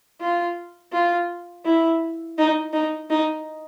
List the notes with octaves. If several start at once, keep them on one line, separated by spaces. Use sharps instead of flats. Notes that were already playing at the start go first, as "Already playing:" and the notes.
F4
F4
E4
D#4
D#4
D#4